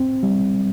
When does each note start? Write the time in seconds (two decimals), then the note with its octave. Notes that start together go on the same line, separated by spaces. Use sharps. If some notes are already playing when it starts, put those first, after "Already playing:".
Already playing: C4
0.23 G3